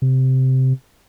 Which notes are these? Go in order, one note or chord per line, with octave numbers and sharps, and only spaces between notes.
C3